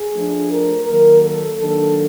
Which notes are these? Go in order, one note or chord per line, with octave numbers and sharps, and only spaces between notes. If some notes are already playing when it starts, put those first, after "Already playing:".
Already playing: G#4
F3 A3 D4
A#4
D#3 F#3 A#3 A#4
A4
D#3 F#3 A#3 D4 A4